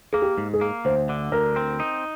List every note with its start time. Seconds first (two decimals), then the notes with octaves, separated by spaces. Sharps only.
0.13 A#3 G#4
0.22 G4
0.38 G#2
0.54 G#4
0.61 A#3
0.85 D2 C5
1.09 D3
1.32 D2 A#4
1.56 C4
1.80 D#4